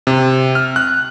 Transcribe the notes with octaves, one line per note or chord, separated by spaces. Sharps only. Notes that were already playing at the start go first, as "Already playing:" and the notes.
C3
F6
F#6